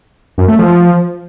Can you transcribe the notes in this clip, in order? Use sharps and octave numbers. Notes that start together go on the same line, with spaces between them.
F#2
A3
F3